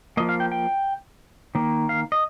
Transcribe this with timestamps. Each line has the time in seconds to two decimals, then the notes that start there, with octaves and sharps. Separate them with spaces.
0.17 F3 A#3 D#5
0.29 F5
0.40 G5
0.52 G5
1.55 D#3 A#3
1.89 F5
2.12 D#5